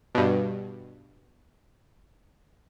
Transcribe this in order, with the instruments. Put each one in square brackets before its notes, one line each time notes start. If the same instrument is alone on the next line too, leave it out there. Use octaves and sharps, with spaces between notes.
[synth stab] G2 B2